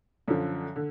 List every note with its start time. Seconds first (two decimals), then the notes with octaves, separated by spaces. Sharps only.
0.28 F#2 D3 F3
0.76 D3